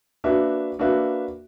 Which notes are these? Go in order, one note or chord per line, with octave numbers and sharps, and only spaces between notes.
A#3 D4 F#4 B4 E5
A#3 D4 F#4 B4 E5